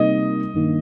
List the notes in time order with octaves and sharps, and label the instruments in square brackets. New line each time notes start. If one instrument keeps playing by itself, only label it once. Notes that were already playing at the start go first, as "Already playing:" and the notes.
Already playing: [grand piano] C3 G3 A#3 D#4 A#4 [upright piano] D#5
[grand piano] G2 D#3 A#3